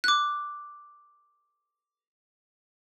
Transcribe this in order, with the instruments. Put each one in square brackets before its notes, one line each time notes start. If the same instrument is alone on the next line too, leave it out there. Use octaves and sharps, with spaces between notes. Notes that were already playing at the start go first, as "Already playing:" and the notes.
[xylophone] D6 F#6